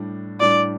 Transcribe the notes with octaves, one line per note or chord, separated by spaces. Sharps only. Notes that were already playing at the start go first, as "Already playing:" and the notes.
Already playing: A2 G3 D4
A2 G3 D4 D5